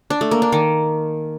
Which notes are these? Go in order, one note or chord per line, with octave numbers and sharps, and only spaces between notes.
D4
A3
A#3
D4
D#3